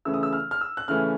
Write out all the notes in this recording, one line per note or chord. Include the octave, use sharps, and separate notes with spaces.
C#3 E3 A3 C#4 E6
D#6
E6
F6
F6
E6
F#6
C#3 E3 A3 C#4 F6